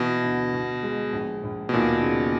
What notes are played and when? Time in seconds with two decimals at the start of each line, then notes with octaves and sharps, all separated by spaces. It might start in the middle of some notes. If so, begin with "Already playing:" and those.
Already playing: B2 E3
0.23 D2
0.53 B2
0.83 G#3
1.12 A#1
1.43 A#1
1.69 B2
1.73 D#2 A#2
2.03 C#3